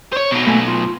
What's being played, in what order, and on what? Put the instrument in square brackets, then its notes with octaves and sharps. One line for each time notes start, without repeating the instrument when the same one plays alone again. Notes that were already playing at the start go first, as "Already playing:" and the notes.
[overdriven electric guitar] C5 C#5
B2 F#3
[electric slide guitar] A3 A#3 G#5
F4